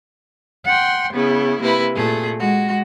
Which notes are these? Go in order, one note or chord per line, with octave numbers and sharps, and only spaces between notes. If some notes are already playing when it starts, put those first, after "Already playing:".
F#5 G5 C6
C#3 B3 E4
C3 A#3 E4 B4
A#2 A3 G#4
G#3 F#4